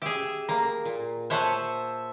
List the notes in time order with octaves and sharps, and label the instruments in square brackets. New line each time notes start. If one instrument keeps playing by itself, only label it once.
[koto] G4 G#4 [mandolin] E5
[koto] A#3 [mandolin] A#5
[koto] A#2
[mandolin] C5 E5 A5 [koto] C#5 F#5 G#5